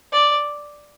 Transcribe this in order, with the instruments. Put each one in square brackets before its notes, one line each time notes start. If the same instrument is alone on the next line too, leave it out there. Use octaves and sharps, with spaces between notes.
[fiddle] D5